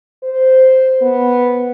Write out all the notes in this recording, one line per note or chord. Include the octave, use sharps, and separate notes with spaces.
C5
B3